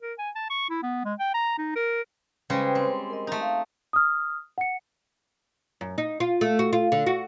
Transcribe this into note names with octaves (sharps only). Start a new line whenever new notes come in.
A#4
G#5
A5
C#6
E4
B3
G#3
G5
A#5
D#4
A#4
C#3 G3 G#3 B4 C5 G5
C4
A#4 D#5
A3 D#4
F5
D#6 F6
F#5 C#7
F#2
D#4
F4
A3
F#4
F4
D3
F#4